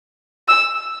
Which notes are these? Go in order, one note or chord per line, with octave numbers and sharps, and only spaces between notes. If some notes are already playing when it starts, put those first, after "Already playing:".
E6